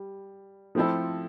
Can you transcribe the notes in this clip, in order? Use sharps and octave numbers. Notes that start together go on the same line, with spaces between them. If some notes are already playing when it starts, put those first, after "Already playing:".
Already playing: G3
F3 A3 C4 E4 A4